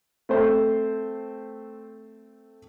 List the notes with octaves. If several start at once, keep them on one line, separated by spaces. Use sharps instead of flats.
A3 C4 C5